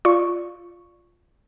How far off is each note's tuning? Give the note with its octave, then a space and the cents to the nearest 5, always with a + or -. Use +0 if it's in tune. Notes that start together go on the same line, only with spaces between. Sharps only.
F4 +0 D5 +0 C#6 +0